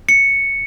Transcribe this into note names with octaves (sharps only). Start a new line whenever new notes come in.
C#7